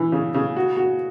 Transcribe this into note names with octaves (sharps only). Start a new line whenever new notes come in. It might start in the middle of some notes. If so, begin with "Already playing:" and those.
Already playing: E3
C#3
C#3
F#4
F#4